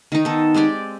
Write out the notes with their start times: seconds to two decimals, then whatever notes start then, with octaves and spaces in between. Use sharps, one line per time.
0.12 D#3 D#4
0.25 B3 A4
0.54 G#3 C4 G4 D5